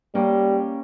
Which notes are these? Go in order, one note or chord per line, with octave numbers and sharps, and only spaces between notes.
G3 A#3 C#4 G5